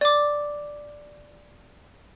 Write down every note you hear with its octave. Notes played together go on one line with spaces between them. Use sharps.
D5 D6